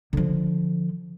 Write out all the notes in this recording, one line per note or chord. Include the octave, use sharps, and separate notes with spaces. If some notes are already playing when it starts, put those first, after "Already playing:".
D3 F3